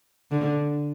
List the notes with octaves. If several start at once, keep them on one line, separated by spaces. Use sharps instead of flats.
D3